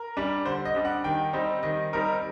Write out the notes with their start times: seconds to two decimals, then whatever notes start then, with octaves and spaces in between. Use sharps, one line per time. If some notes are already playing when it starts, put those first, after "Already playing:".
Already playing: A#4
0.17 G3 D4
0.45 D3 C5
0.65 D#5
0.75 G3 D4
0.85 F#5
1.04 D#3 G5
1.33 G3 C4 D#4
1.63 D#3 D#5
1.93 G3 C4 D#4 A#4